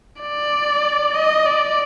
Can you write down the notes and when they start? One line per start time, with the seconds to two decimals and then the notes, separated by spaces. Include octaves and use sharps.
0.21 D5
1.15 D#5
1.46 D5